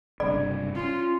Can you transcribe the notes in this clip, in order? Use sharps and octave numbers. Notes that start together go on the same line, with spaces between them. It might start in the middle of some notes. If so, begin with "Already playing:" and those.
F#1 G2 C3 D5
C#4 F4